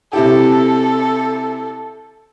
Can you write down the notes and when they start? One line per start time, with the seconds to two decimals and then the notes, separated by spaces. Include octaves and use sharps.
0.13 C3 E4 G4 A4